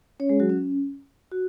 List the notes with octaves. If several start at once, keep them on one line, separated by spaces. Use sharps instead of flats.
C#4 C#5
G#3 G#4
F#3 F#4
C#4
F#4